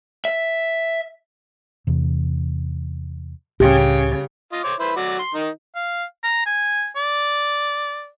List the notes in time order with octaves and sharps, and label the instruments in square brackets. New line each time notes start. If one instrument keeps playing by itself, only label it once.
[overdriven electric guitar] E5
[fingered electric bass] E2 C3
[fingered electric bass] C#2 A2 D4 [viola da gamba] C#3 [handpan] G4
[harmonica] F4 D#5
C5 C#5 D6
E4 B4 C5
F#3 F#4 D5
C6
D#3 D#4
[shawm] F5
A#5
G#5
D5